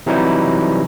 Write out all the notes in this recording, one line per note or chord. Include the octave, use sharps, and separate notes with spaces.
C3 E3 F#3 G3 D#4 E4